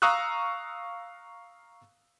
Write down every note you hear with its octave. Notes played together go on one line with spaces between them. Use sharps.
F5 A#5 C#6 D#6 E6 F#6